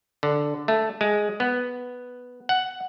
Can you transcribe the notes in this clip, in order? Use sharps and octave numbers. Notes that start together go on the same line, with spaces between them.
D3
A3
G#3
B3
F#5